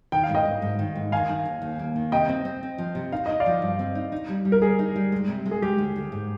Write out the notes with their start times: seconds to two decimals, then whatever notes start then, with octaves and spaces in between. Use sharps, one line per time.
0.12 D#3 G5
0.23 F5
0.29 G#2
0.35 D#5 G5
0.46 G#2
0.62 G#2
0.79 D#3
0.96 G#2
1.12 D#3 F5 G#5
1.29 D#4
1.45 D#2
1.62 D#2
1.79 A#3
1.96 D#3
2.12 C3 D#5 G5
2.29 C4
2.45 C4
2.63 C4
2.78 F3
2.95 C3
3.12 D#4 F5
3.26 D#4 D#5
3.40 D5 F5
3.46 F3
3.62 G2
3.79 C4
3.95 D#4
4.12 D#4
4.29 G3
4.45 G3
4.52 A#4
4.62 G3 G#4
4.79 D#4
4.96 G3
5.12 G#3
5.28 C3
5.46 G#3
5.51 G#4
5.62 G#3 G4
5.78 D2
5.96 D2
6.12 G#2